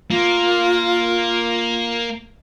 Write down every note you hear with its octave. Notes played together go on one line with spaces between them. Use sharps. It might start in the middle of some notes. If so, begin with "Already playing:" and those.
A#3 F4